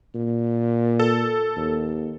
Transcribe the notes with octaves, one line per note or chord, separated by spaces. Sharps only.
A#2
A4
D#2